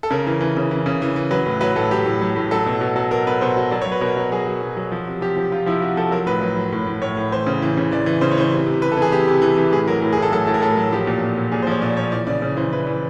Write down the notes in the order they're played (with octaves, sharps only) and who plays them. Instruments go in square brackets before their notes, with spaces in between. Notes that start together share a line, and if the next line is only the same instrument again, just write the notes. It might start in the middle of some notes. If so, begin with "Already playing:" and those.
[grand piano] A4
C#3 A#4
E3
E3
C#3
E3
C#3
E3
E3
F#3 B4
A2
F#3 B4
A2 A4
F#3 G4
A2
F#3
A2
F#3 A4
B2
B2
F#3
B2 A#4
B2 B4
B2 C5
F#3
F#3 D5
C#5
F#3
B4
B2 A#4
F#3
F#3 G#4
F#3
B2
F#3
F3
C3
F3 G4
F3
C3 F4
F3 E4
C3 F#4
F3 A4
F#3 A#4
A2 B4
F#3
F#3
A2
A2
A2 C#5
A2
E3 C5
C#3
E3
C#3
E3 D5
E3
C#3 C5
C#5
E3 C5
C3
C3
C3 B4
A4
E3 G#4
C3 G4
C3
E3
E3
A2 G#4
F#3 A#4
A2
G#4
A2 A4
F#3 A4
A2 A4
A#4
A2 A4
F#3
F3 G4
A#2
A#2
A#2
A#2 G#4
C5
F3 C#5
A#2 D5
F3 C#5
E3 D5
C#3 D5
C#3
E3 C5
E3 B4
E3